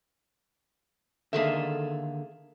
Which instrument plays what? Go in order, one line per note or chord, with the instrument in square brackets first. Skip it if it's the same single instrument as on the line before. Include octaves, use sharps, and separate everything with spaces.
[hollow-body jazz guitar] D3 D#3 A#3 [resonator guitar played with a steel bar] G#4 A4 E5